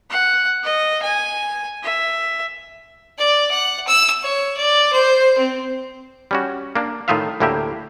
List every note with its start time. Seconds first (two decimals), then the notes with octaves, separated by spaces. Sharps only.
0.10 F#5
0.64 D#5
1.02 G#5
1.83 E5
3.18 D5
3.51 F#5
3.87 E6
4.23 C#5
4.57 D5
4.92 C5
5.38 C4
6.31 G3 C#4 F#4
6.76 A#3 D4
7.08 A2 D#3 D#4 F4 E5 F5
7.40 D2 A2 A#3 E4 G4 E5